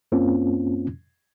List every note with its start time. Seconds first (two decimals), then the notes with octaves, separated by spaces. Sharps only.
0.12 F#2 A#3 C4 C#4 F4